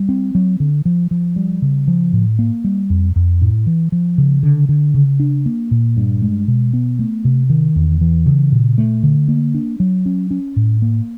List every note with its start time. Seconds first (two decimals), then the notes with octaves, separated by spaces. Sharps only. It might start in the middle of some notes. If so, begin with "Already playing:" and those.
Already playing: G3
0.09 C4
0.35 F#3
0.60 D3
0.85 F3
1.11 F3
1.36 G3
1.62 C#3
1.88 F3
2.13 A2
2.39 A#3
2.64 G3
2.90 F2
3.16 F2
3.41 A2
3.67 E3
3.92 F3
4.18 C#3
4.43 D3
4.69 D3
4.94 C#3
5.20 D4
5.46 A#3
5.71 A#2
5.97 G2
6.22 G#3
6.48 B2
6.73 B3
6.99 A3
7.25 C3
7.50 D#3
7.76 E2
8.01 E3
8.26 C#3
8.52 A#2
8.78 A3
9.03 D3
9.28 A#3
9.54 D4
9.80 F#3
10.06 C#4
10.31 C#4
10.56 A2
10.82 A#3